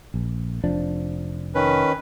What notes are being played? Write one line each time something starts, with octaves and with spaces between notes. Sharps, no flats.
A#1
F1 F3 D4
D#3 C#4 B4